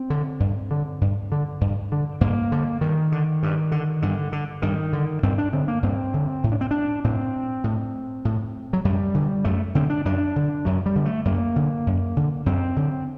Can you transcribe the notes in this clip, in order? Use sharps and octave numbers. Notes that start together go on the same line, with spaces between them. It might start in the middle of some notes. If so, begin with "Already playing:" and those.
Already playing: C4
D3
G2
D3
G2
D3
G2
D3
G2 A#3
D3
G2 D#3
D3
G2
D3
G2 D3
D3
G2 D#3
D3
G2 C4
D4
D3 C4
A#3
G2 C4
D3
A2
D4
C4
D4
A2 C4
A2
A2
F#3
F#2 G3
D3
F#2 A3
D3 C4
D4
F#2 D4
D3
F#2 F#3
G3
D3
A3
F#2 A#3
D3
F#2
D3
F#2 C4
D3